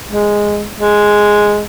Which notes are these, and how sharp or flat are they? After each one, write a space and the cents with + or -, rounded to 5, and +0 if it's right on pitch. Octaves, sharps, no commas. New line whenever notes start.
G#3 -5
G#3 +0